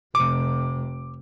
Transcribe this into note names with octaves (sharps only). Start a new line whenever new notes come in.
F1 C3 D6